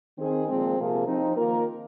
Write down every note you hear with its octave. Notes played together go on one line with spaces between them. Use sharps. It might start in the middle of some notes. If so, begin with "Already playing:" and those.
D#3 C4 G#4
A#2 F3 G#3 C4
C3 F3 A#3 G#4
F3 C4 D#4
D#3 A#3 F4 A#4